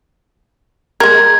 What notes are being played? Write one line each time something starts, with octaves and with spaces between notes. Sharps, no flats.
G#3 A#4 G#6